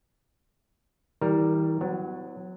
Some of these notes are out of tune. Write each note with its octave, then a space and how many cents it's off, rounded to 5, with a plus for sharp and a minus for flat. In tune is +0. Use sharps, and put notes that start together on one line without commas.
E3 -40 G3 +0 A#4 +0
F#3 -15 B3 +35